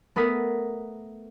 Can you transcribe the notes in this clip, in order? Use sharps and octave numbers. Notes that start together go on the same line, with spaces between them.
A3 B3 A#4 D#6 B6